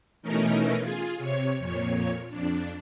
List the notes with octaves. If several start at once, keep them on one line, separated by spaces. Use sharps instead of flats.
B2 E3 A3 C#4 D#4 A#4
F4 G#4
C3 C#5
F2 A#2 C#5
F2 D4